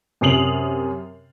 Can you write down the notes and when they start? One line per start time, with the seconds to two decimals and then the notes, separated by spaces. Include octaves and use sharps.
0.21 F#2 C3 D#6 C7 F7 F#7